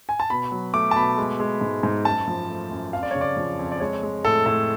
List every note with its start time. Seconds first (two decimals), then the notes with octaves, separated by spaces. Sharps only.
0.09 G#5
0.20 A5
0.30 B2 B5
0.52 F#3
0.73 A3 D6
0.91 A5
0.96 B2 B5
1.18 G#3
1.40 G#3
1.61 G#2
1.83 G#2
2.05 F#2 A5
2.28 F3
2.50 A3
2.71 F#2
2.93 F2 F5
3.03 D5
3.11 C#3 C#5
3.21 D5
3.37 F3
3.59 F2
3.72 D5
3.80 G#3 C#5
4.03 G#3
4.25 A2 A4
4.46 A2 A4